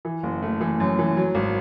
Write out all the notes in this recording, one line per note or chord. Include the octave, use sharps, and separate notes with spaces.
E3
F#1
A3
E3
F#2
E3
F#3
G#1